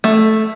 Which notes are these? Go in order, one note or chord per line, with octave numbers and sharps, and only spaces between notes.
A3